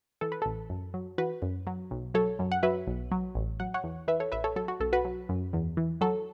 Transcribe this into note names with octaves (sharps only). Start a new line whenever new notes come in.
E3 A4
B4
A1 A4
F#2
F#3
E3 F#4 B4
F#2
F#3
B1
F#3 A4 C#5
F#2
F#5
F#3 B4 E5
B1
F#3
A1
F#3 F#5
C#5 F#5
E2
E3 B4 E5
A4 C#5
A1 B4 E5
A4 C#5
F#3 A4
F#4
B1 A4
F#4 B4
F#3
F#2
E2
E3
F#3 A4